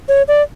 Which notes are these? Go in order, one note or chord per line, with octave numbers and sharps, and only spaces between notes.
C#5
D5